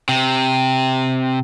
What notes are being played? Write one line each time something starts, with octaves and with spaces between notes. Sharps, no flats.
C3